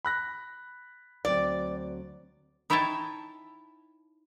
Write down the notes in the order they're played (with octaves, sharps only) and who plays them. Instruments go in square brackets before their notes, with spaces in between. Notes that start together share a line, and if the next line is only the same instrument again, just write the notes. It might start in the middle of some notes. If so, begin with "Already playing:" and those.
[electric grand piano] B5 F#6 A#6
[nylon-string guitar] D2 F#3 C4 [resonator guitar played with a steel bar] D5
[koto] D#4 E4 C#5 E5 G5 A5